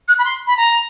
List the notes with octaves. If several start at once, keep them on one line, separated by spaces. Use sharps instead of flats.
F#6
B5
C6
B5
A#5